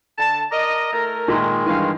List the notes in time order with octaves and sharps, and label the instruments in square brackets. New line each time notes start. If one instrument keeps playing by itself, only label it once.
[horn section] D3 A5
[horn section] A#4 D5 D#5 [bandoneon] A#5
[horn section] A3 E4 A#4
[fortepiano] A#2 [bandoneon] D#3 G#3
[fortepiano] G2 E3 [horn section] D#5 F5